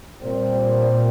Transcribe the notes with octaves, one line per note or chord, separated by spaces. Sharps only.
A#2 G3 C4